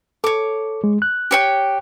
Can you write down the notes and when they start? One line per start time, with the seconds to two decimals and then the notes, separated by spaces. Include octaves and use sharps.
0.24 A4 C#5 D6
0.84 G#3
1.02 F#6
1.31 G4 C#5 G5